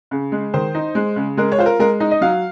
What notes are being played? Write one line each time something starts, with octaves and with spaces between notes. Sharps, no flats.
C#3
G#3
D#3 C5
D#4
G#3
C#3
G#3 A#4
C#5
F4 C5
A#4
G#3 A#4
D#4
D#5
F#3 F5